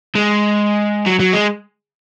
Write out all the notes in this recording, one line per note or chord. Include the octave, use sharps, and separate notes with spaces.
G#3
F#3
F#3
G#3